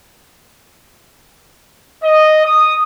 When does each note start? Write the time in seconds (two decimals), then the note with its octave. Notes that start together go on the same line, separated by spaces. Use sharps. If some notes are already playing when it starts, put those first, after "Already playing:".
2.03 D#5
2.45 D#6